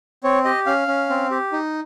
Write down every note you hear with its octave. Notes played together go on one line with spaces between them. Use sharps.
C4 C#5
G4 D#5
C#4 F5
C#4
C4
G4
D#4